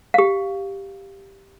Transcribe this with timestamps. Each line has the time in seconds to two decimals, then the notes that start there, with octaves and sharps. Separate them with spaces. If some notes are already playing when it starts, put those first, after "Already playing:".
0.14 G4 F5